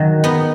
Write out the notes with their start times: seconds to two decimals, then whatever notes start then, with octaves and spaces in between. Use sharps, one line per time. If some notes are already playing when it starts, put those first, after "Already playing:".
Already playing: D#3 F#3
0.24 B3 D#4